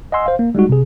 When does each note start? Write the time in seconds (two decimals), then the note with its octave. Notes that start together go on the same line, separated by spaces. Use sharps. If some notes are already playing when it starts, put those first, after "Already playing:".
0.12 D#5 F#5 G#5 C6 E6
0.26 C5 F5
0.39 A#3
0.55 G3 G#3 D#4 F#4
0.69 C3 G#4